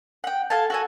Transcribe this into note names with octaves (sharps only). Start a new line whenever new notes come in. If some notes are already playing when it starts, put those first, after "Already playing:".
F#5 G5
A4 F5 G#5 A5
F#4 A4 G#5